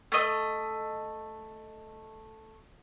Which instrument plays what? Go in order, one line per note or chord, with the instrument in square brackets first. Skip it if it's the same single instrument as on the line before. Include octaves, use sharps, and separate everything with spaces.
[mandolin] A3 D#5